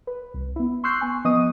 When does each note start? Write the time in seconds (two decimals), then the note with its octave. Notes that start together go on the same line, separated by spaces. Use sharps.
0.07 B4
0.34 C2
0.56 B3 E4
0.84 C6 C#6 E6 F#6 G6 C7
1.00 B3 G#5 C#6
1.25 F3 B3 D#5 C#6 D#6 D#7